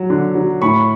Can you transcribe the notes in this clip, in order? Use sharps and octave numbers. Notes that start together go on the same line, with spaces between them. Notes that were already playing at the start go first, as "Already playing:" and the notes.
Already playing: F#3
D3
F#3
A2 B5 C#6